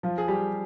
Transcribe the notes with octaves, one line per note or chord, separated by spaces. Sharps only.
F3 F4
G#4
G3 G4